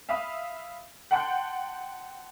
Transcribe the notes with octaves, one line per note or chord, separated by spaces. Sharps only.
E5 F5 B5 D#6
F#5 G5 A5 C6 F#6 G6